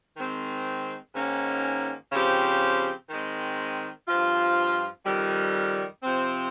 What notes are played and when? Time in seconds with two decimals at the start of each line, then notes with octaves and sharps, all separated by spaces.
0.17 D#3 G#3 C4
1.15 G#2 D#3 A#3 C#4
2.12 C#3 F3 C4 G4
3.10 D#3 G#3 C4
4.07 G2 F3 C4 F4
5.05 F2 D#3 G3
6.03 C3 F3 C4